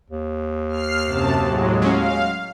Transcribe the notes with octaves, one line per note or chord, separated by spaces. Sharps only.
D#2
F6 C7
F#2 C3 A5
A2 F#3 G#3
F#3 G#3 C#4 F5